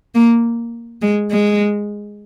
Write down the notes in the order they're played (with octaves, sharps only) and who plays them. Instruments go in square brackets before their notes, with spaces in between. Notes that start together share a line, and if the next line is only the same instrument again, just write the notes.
[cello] A#3
G#3
G#3